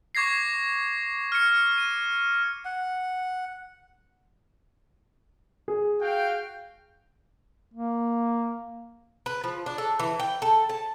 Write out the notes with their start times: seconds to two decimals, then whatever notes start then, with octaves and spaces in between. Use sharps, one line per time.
0.15 C#6 D6 G#6 A#6 C7
1.32 F6 C#7
1.78 D#7
2.65 F#5
5.68 G#4
6.00 F#4 F5 G5
7.74 A#3
9.26 B4
9.44 F3
9.66 D4
9.78 A4
9.99 E3
10.20 G5
10.42 A4
10.69 A5